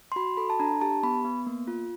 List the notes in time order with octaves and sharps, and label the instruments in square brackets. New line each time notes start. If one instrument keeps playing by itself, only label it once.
[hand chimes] C6
F#4 B5
A4 B5
A5
D4 A#5
G4 A5
B3 B5
B3
A#3
F4